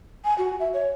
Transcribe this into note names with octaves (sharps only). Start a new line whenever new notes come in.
G#5
F#4
E5
C#5